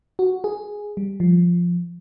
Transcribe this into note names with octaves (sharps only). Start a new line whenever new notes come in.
F#4
G#4
G3
F3